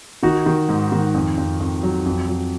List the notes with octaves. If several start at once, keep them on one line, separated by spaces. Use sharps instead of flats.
D#3 D#4 F#4
D#3
G#2
D#3
F2
F2
F2
F#3
F2
F#3